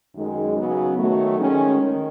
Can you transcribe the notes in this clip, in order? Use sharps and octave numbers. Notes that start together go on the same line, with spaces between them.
F#2 D#3 G#3 D#4
C#3 F#3 B3
D#3 F#3 A3
D#3 G#3 C#4
D#3